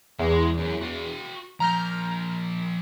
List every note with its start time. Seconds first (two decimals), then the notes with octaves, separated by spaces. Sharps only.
0.19 E2 G#3
0.57 F#2
0.81 F#4 F5
1.60 F3 A#3 A#5 F6 G6